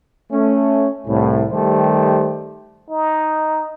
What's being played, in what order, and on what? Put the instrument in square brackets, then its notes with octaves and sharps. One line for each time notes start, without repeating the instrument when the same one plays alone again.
[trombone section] A3 C#4
C2 A2
D#3 G3 A3 G4 C5
[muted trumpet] D#4